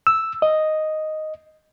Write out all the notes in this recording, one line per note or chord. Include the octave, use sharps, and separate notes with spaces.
E6
D#5